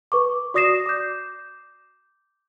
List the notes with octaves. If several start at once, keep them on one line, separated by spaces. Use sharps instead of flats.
B4 C#6 D6
F#4 D5 D#6 A#6 C7 E7
D6 G6